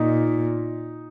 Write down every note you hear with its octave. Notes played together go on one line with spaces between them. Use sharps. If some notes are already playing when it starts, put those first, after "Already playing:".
Already playing: A#2 D#4